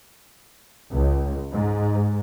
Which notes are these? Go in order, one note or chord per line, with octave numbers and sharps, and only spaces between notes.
C#2
G#2